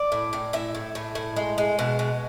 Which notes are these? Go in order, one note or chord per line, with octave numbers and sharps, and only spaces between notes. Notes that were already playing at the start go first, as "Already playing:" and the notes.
Already playing: D5
A2
A2
A2 E5
A2
A2
A2
G#3
G#3
B2
B2